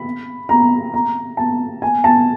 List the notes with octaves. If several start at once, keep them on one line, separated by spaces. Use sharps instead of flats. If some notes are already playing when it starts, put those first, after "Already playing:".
Already playing: B5
A#5
A#5
A5
G#5
A5